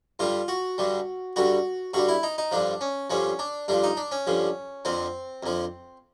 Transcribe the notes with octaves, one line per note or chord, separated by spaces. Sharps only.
G2 D3 G3 F4
F#4
G2 D3 G3
G2 D3 G3 F#4
G2 D3 G3 F#4
E4
D#4
D#4
G2 D3 F3 D4
C#4
G2 D3 F3 C#4
D4
G2 D3 F3 D4
D#4
D4
C#4
G2 D3 F3
F2 D3 F3 C4
F2 D3 F3